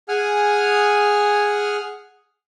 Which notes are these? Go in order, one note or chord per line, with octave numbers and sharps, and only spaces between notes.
G#4 F#5 G#5 D#6 F6